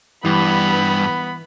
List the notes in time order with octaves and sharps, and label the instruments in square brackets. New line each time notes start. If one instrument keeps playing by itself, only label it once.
[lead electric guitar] G2 [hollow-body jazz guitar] E3 [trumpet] B3 [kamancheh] B5